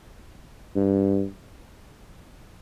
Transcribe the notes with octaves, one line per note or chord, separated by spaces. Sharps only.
G2